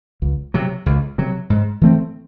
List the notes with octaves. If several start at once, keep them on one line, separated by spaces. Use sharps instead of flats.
C#2
C3 F#3
C#2
C3 F#3
G#2
E3 A3 C4